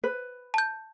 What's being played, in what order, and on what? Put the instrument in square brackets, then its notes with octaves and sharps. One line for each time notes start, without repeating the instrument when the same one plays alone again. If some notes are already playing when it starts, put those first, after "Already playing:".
[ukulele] B4
[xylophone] A5 G6